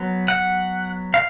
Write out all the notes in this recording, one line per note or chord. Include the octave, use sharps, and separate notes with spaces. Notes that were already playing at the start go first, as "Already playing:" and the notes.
Already playing: F#3 B3
F#5
F5